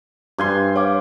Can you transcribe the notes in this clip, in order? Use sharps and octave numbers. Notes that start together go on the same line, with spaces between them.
G2 G#5 C6
C#5 F5 D6